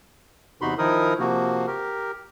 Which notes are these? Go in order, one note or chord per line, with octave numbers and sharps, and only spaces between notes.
E2 C3 D#4 F#4 B5 C6
D#3 F3 D#4 E4 A#4 D#6
C3 F3 A#3 F#4
G4 A#4